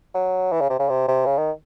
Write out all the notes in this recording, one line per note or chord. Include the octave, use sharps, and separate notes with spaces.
F#3
E3
C#3
C3
C#3
C3
C3
C#3
D#3